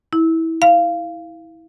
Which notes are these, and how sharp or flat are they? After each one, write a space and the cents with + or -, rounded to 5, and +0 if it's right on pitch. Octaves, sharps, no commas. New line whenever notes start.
E4 -20
F5 -15